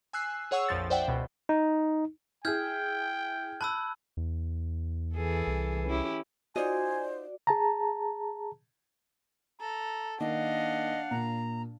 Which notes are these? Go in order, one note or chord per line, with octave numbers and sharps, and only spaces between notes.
G#5 E6 F#6 C7
G#4 C#5 F#5 C#6 E6
A#1 F2 F3 A6
C5 D5 E5 F#5 G5
C#2 B2
D#4
E4 G#4 G5 F6 G6 G#6
A5 B5 E6 F#6
E2
E3 G#4 A4
C2
C#4 E4 G4
D#4 F4 F#4 C5 D5 D#5 G#5
G#4 A5 A#5
A4 A#5
D#3 A#3 D4 D#5 F5 F#5
A#2 A#5